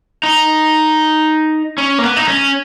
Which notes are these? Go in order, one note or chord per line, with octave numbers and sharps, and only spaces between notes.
D#4
C#4
A#3
B3
D#4
C#4